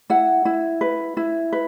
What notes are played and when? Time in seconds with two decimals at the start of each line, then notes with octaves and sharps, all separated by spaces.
0.10 E4 F#5
0.45 E4
0.81 B4
1.17 E4
1.53 B4